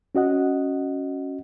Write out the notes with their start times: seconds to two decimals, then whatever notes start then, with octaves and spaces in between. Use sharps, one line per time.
0.15 C#4 F#4 D#5 F#5